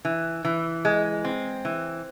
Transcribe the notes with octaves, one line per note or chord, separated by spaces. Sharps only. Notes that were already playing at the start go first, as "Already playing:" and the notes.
E3
E3
G#3
C4
E3